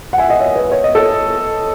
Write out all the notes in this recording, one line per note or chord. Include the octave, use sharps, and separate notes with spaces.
F#5
E5 G#5
D#5 F#5
C#5 E5
B4 D#5
C#5
D#5
A4 C#5